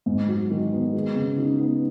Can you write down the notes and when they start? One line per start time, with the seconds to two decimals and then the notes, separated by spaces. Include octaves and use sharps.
0.06 G#2
0.29 F#3
0.50 D#3
0.73 B3
0.94 G#3
1.16 C#3
1.38 D#4
1.60 B3